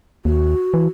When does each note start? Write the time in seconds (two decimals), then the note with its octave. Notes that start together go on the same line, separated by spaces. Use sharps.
0.25 D#2 F#4
0.74 E3